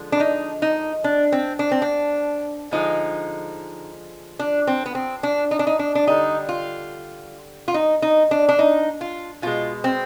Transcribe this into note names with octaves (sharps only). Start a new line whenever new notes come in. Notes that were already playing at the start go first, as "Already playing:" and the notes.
Already playing: D3 F3 G#3
D4
D#4
D#4
D4
C4
D4
C4
D4
D3 F3 G#3 D#4
D4
C4
B3
C4
D4
D#4
D4
D#4
D4
D4
D3 G3 D#4
F4
F4
D#4
D#4
D4
D4
D#4
F4
B2 G#3 F4
C4